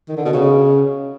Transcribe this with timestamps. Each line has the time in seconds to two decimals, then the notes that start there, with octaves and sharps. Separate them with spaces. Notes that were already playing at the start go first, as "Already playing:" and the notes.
0.09 D#3
0.17 D3
0.25 B2
0.34 C#3